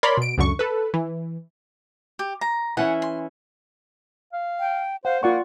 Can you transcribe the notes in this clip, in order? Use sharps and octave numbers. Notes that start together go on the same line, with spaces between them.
A#4 C#5 D5 B5 C6
B2 D7
C#2 F#2 D3 C#6
A4 B4
E3
G4
A#5
E3 C#4 E4 F#5
C6
F5
G5
C5 F5 F#5
A#3 F4 D5 F#5 C#6